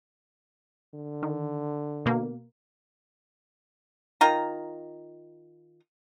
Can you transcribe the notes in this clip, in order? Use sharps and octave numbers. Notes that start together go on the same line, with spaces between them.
D3
D#3
B2 A#3
D#3 F4 A#5